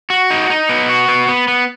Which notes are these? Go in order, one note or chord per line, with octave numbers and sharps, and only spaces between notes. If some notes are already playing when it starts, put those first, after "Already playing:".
F#4
D#4
D#4
B3
F#4
B3
B3
B3